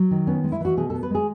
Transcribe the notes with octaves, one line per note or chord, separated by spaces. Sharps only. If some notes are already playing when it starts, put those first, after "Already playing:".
Already playing: F#3
D#3
B3 C#4
G#3
E4
E3 F#4
B2 G#4
B3 A4
B4
G#3 G#4